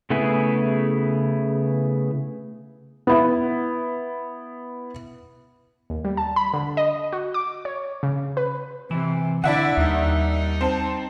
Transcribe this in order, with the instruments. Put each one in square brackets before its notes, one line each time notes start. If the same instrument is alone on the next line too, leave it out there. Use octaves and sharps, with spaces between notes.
[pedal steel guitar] C#3 A3 B3 E4 G#4
[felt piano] B3 E4
[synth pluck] D#2
G3
A5
B5
D3
D#5
F#4
D6
C#5
C#3
B4
[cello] C3 [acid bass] E3
[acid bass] D3 [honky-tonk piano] D4 E5 F#5 [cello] E4 D5
[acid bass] D#2 [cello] G3 D#4
[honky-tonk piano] C4 A5